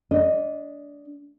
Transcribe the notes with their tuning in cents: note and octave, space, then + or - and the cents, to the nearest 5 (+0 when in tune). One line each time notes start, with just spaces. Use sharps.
D4 -25 D#5 +0